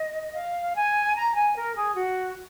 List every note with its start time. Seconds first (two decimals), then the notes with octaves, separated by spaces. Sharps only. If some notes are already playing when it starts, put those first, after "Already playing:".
Already playing: D#5
0.34 F5
0.74 G#5
1.16 A#5
1.35 G#5
1.56 A#4
1.76 G#4
1.96 F#4